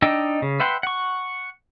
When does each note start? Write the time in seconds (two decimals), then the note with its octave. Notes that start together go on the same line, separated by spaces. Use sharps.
0.02 D4 D#4 D#5 G5 E6
0.42 C#3
0.60 B4 E5 F#5 G5 C6
0.83 F#5 C#6